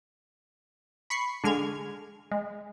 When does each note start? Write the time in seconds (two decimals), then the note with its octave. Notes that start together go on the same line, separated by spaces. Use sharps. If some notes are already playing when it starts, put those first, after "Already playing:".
1.10 B5 C#6 C7
1.44 D3 G#3 F6 G#6
2.31 G#3